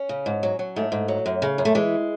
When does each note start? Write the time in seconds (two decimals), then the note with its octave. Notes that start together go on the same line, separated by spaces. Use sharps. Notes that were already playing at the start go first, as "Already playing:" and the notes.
Already playing: C#4
0.09 C#3
0.26 G#2
0.43 F#3
0.59 F#3
0.76 G#2 A3
0.92 G#2
1.08 F#3
1.26 F#2
1.42 C#3
1.58 F#2
1.65 A3
1.75 E3 G#3